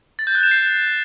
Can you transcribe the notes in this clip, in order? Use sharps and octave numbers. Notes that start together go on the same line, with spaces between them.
A6
G6
F#6
E7
C7